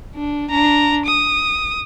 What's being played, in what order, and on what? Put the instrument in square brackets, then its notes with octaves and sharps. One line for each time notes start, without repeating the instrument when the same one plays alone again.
[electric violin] D4
D4 A#5
D#6